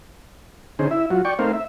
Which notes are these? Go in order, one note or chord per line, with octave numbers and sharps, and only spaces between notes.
D3 C#4 D#4 G#4 C5
E4 E5
F#3 F4 F#4
D5 G5 C#6
A3 C4 D#4 A#4 C5 F5
E5